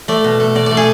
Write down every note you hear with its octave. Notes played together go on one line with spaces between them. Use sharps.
A3 D5
B2
A3
B2 D5
A3 D5
G#4